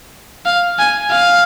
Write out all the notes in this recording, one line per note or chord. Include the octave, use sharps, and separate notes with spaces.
F5
G#5
F5